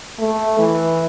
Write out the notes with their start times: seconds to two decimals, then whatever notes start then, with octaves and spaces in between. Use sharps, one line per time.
0.19 A3
0.59 E3